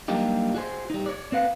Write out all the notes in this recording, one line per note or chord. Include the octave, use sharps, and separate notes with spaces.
F#3 G3 A#3 D4 D#4 G4
F#4 G#4 C5
G3 D#4
C#5 D5
C4 B4 F5 F#5